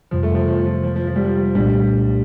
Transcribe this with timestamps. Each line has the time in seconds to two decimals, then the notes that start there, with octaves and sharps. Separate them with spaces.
0.11 F2 C3 F3 G3
0.23 A3
0.35 F3
0.48 F3
0.65 F3
0.84 F3
0.96 F3
1.07 F3
1.16 G3
1.24 F3
1.55 C2 A#2 G3 A3 D4